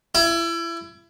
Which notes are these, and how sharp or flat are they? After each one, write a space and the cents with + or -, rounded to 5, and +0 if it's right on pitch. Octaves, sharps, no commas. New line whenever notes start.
E4 +30